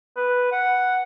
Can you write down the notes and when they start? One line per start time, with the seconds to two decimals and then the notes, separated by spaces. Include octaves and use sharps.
0.17 B4
0.52 F#5